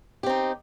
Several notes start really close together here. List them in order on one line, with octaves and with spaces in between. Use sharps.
G4 C4 D#4